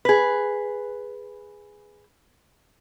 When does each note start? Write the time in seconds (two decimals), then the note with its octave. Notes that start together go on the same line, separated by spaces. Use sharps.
0.05 G#4 B4